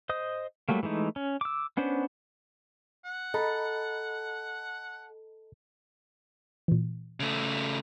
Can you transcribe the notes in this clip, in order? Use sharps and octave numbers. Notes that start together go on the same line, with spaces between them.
C5 D#5 D#6
F#3 G3 A3 A#3
E3 G#3 A3 D#4
C#4
D6 E6
B3 C#4 D4 C5
F#5
A4 D#5 A#5 B5
A#2 E3
C#3 A3